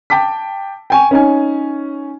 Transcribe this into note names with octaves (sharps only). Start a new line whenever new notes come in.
G5 A5 D6 B6
G5 G#5 C#6
C#4 D#4 G#5